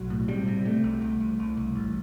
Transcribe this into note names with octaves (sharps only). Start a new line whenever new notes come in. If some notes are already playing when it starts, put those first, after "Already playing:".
Already playing: B1 F#3
A2
C3 G3
C3
C3 A3
C2
C2
C2
C2
C2
A1